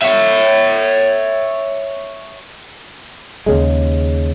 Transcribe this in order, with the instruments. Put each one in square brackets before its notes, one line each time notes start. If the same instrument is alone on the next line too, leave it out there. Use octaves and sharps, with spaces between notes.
[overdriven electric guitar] C#5 E5
[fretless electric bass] D#2 C#3 G#3